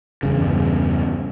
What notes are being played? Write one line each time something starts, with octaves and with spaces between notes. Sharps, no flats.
E2 G2 C#3